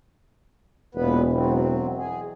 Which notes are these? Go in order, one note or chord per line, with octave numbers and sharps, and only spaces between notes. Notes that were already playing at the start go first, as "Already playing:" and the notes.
E1 A#2 B3 B4
F#3 C4
G#4